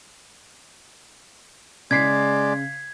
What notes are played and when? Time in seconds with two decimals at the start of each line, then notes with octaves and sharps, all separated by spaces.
1.91 C#3 G#3 D5 G#6 B6 C7